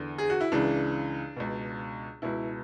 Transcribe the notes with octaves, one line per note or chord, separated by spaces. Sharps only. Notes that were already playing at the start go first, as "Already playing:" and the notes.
Already playing: E2 D3
G#4
F#4
E4
C#2 C#3 E3 D4
C#2 B2
C#2 B2 E4